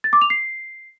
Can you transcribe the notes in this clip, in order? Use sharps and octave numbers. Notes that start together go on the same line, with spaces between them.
A6
D6
F7
C7